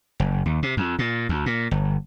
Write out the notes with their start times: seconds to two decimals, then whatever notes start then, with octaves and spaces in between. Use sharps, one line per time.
0.20 F#1
0.46 D#2
0.63 C3
0.77 F2
0.99 A#2
1.29 D2
1.46 A#2
1.71 G1